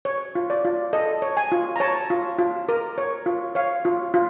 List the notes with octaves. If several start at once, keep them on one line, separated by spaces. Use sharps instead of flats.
C#5
F4
D5
F4
A4 D#5
C#5
G#5
F4
A#5
C#5 A5
F4
F4
A#4
C#5
F4
C#5 F5
F4
F4